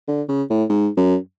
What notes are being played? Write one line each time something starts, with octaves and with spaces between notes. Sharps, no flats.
D3
C#3
A2
G#2
F#2